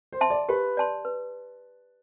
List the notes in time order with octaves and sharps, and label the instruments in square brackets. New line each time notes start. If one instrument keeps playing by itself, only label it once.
[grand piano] C5
[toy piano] E5 A5 C6
[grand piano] D5
[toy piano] G4 [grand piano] B4
[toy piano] D5 A5 C6
B4